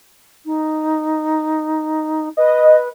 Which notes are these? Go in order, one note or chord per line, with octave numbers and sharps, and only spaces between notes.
D#4
B4 D#5